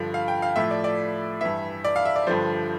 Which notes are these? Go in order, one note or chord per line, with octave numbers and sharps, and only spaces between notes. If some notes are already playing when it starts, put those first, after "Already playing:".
Already playing: G2 D3 F3
F5
G5
F5
A2 F3 E5
D5
D5
G2 E3 E5
D5
F5
E5
D5
G2 D3 F3 C5